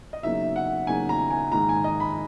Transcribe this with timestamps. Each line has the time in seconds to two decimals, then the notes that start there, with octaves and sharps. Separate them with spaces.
0.13 D#5
0.23 E2 C#3 F#3 A#3 D#4 E5
0.56 F#5
0.87 E2 C#3 F#3 A#3 D#4 G#5
1.09 A#5
1.31 G#5
1.52 G#2 D#3 A#3 D#4 A#5
1.69 G#5
1.84 D#5
2.00 B5